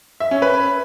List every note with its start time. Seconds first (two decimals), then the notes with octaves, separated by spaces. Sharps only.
0.20 E5
0.31 C#4
0.42 B4